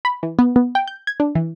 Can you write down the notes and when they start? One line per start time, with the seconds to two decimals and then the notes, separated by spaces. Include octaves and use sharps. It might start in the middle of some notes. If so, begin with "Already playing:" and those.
0.05 B5
0.23 E3
0.39 B3
0.56 B3
0.75 G5
0.88 G6
1.07 G#6
1.20 D4
1.35 E3